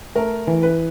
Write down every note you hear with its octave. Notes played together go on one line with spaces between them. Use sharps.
A3 A#4
E3
B4